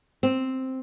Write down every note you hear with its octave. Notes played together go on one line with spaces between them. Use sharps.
C4